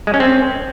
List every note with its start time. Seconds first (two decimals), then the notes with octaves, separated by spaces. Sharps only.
0.07 G#3
0.14 C#4
0.20 C4